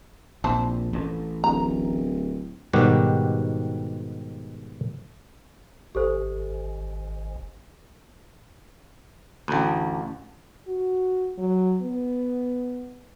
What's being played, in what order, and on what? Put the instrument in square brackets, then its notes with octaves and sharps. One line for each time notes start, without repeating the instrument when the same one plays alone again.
[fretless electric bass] A#1 [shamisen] E3 C4 A5
[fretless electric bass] A1
[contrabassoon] D1 [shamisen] A#5
[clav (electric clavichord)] G#2 B2 D#3 G3 F#4 G4
[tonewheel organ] G#1 [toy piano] G4 A4 C5
[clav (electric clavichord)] A1 D2
[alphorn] F#4
F#3
B3